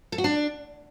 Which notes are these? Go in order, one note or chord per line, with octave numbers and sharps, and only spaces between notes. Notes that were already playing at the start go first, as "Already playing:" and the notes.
A4
F#4
D4